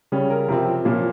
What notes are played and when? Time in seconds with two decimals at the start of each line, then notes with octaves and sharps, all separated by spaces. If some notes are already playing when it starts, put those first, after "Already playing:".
0.12 C#3 G3 C#4
0.30 A#4
0.48 C3 F3 C4 A#4
0.85 A#2 F3 A#3 C#4